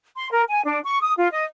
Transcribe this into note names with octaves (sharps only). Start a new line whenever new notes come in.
C6
A#4
G#5
D4
C#6
D#6
F4
D#5